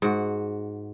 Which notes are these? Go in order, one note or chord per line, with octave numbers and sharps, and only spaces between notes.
G#2 F#4